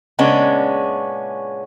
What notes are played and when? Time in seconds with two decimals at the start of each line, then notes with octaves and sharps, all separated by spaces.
0.19 A#2 C#3 G#3 B3 C#4 D4